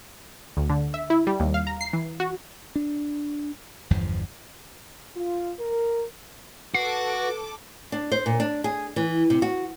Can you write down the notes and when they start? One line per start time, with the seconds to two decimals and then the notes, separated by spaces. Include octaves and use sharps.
0.57 D2
0.70 D3
0.94 E5
1.10 E4
1.27 G3
1.40 D#2
1.54 F5
1.67 A#5
1.81 C7
1.93 E3
2.20 F#4
2.76 D4
3.90 G1 E2 G2 F3
5.15 F4
5.59 A#4
6.74 F#4 A4 B4 D6 C7
7.92 D4
8.12 C5
8.26 A#2
8.40 D4
8.64 G#4
8.96 E3
9.30 C3
9.42 F#4